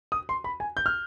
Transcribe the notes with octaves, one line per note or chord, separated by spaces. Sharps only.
D#6
C6
B5
G#5
G6
F6